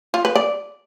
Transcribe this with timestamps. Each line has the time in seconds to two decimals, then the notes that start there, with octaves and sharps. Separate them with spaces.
0.14 F4
0.25 B4
0.35 D5